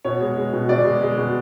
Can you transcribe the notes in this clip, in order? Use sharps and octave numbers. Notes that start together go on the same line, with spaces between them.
B2 C#5
G#3
G#3
B2
B2 D5
G#3
G#3
B2